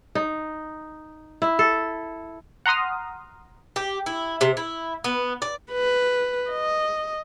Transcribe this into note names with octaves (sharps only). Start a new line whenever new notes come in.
D#4
E4
A4
F#5 A#5 C6 D#6 F6
G4
E4
C3
E4
B3
D5
B4
D#5